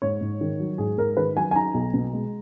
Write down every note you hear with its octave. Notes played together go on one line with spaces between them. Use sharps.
G#2 C#5
G#2
D#3
F#3
G#2 G#4
G#2 A#4
D#3 B4
F#3 G#5
G#5
D#4 A#5
B1
B2
G#3